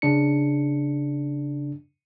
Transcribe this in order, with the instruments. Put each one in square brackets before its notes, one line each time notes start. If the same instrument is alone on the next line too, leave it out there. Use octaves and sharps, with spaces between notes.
[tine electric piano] C#3 D4 C#7